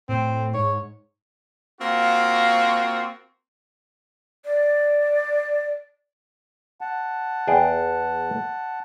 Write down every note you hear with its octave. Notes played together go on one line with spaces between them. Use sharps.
A2 C4
G#2 C#5
A#3 C4 F4 F#4
D5
F#5 A5
E2 G#4 G5